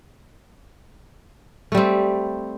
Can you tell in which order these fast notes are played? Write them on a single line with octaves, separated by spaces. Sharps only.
A3 G3 C4